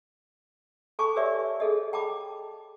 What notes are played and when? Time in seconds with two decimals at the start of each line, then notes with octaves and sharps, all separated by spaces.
0.99 A4 G#5 A5 B5 C#6 D6
1.16 G4 A#4 B4 C#5 D5 E5
1.60 G#4 A4 D#5
1.93 G5 A5 B5 D6